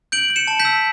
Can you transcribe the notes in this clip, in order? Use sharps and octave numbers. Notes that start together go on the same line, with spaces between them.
G6 D7 F#7
G6
C#7 E7
A5
G6 B6
E6